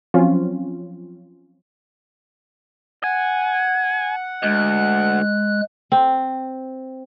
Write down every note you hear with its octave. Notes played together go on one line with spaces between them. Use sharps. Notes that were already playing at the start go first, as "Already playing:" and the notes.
F3 F#3 C4 C#4 F4
F#5 G#5
D2 G#3 F#6
C4